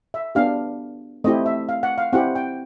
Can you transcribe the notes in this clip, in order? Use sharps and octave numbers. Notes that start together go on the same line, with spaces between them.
E5
B3 D4 G4 F5
A3 C4 E4 G4 D#5
E5
F5
F#5
F5
C4 E4 G4 F#5
G5